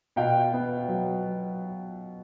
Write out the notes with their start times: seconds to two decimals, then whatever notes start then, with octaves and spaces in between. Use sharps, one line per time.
0.16 B2 F5 G5
0.54 B3
0.89 F#3